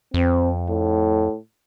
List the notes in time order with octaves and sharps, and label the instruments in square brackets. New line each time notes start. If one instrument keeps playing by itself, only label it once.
[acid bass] F2 [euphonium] C4
[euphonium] A2